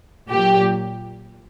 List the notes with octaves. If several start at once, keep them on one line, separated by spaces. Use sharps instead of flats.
A#2 F#3 G4